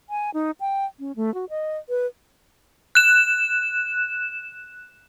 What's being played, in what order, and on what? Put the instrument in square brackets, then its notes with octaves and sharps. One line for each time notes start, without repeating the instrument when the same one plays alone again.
[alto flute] G#5
D#4
G5
C#4
A3
F#4
D#5
B4
[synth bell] F#6 E7